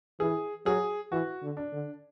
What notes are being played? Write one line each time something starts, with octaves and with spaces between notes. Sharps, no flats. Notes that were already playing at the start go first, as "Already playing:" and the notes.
E3 G#4
F#3 G#4
E3 F#4
D3
D4
D3